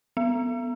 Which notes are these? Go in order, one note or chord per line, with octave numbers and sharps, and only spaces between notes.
B3